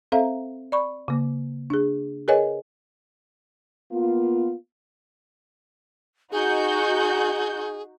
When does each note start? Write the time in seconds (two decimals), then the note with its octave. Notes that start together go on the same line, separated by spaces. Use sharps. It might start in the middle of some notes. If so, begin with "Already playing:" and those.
0.12 C4 A4 C5 E5 F5 A#5
0.72 D5 B5 C#6
1.08 C#3 A#3
1.70 D4 G#4
2.28 G#4 A#4 B4 C#5 D#5 G#5
3.92 A#3 B3 F4
6.32 D#4 F#4 G#4 G6